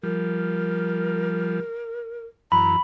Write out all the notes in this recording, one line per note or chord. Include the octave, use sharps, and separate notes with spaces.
F3 G3 A#4
F#2 E3 A#5 B5